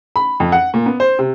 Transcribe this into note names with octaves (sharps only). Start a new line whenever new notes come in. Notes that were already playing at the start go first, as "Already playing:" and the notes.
B5
F2
F#5
A#2
B3
C5
C3